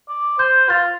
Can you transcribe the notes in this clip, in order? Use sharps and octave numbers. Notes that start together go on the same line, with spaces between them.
D5
C5 G6
F4 A6